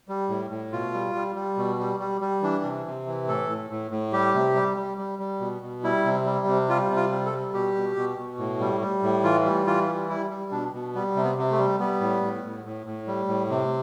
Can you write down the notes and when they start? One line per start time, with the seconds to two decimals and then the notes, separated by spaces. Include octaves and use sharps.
0.09 G3
0.29 A2
0.50 A2
0.72 B2 F4
0.93 G3
1.15 G3
1.35 G3
1.57 B2
1.79 G3
2.00 G3
2.21 G3
2.42 E3 D4
2.64 C3
2.86 C3
3.07 E3
3.27 A2 A4
3.50 A2
3.70 A2
3.91 A2
4.13 G3 G4
4.34 C3
4.55 G3
4.77 G3
4.98 G3
5.19 G3
5.40 B2
5.62 B2
5.84 G3 E4
6.05 C3
6.26 G3
6.47 C3
6.69 G3 F4
6.90 C3
6.96 F4
7.11 G3
7.26 A4
7.32 G3
7.54 B2 G4
7.75 B2
7.96 B2
8.18 B2
8.39 A2
8.60 G3
8.81 G3
9.03 A2
9.23 E3 F4
9.45 G3
9.67 E3 F4
9.88 G3
10.09 G3 E4
10.30 G3
10.51 B2 D4
10.73 B2
10.95 G3 B3
11.16 C3
11.23 B3
11.38 C3
11.51 A3
11.58 G3
11.80 G3 B3
12.00 A2
12.22 A2
12.44 A2
12.65 A2
12.86 A2
13.08 G3
13.28 A2
13.50 C3